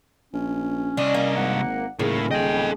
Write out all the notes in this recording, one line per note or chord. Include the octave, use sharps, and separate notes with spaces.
A#1 C#4
C2 D4 D#5
A#3
G#1 F#5
D#1 A2 C#3 A#4
A4 D#5 G5